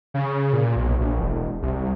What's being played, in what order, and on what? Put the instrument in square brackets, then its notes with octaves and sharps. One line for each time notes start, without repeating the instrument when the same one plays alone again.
[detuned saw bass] C#3
A#2
B1
A#1
E1
C2